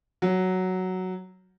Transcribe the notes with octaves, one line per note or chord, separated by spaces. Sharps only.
F#3